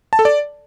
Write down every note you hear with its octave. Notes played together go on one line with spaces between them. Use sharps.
A5
A4
D5